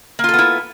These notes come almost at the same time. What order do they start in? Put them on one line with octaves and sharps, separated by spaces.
A#3 F4 A4 B3 E4